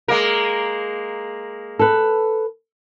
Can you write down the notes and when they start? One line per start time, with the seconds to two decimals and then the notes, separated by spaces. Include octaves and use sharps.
0.08 G#3 A#3 A#4
1.79 A4 B4